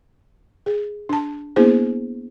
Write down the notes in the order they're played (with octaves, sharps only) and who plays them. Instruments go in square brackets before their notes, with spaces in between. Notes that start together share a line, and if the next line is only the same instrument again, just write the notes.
[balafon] G#4
D4 A5
A#3 B3 D4 E4 G#4 C5